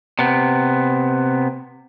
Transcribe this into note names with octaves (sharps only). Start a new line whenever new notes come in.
C3 B3